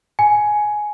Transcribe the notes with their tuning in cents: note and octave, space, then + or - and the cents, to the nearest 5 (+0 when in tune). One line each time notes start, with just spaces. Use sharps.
G#5 +10